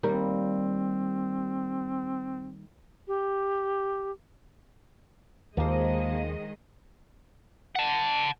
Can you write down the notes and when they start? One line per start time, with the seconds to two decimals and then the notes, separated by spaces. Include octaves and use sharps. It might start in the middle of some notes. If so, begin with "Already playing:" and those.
0.03 D#2 G3 C4 A#4
3.08 G4
5.57 D#2 D#3 F3 G#3 A#3 C5 D#5
7.75 F#5 A5